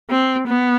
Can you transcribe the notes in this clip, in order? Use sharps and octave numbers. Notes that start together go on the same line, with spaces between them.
C4
B3